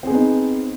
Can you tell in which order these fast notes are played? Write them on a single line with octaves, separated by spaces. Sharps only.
C4 G#4 B3 D#4